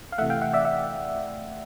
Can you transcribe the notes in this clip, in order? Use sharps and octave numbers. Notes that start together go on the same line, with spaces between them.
F5
C3 E3 A3 E5 F#5
F5 G5
E5 F#5
D5 E5
E5 F#5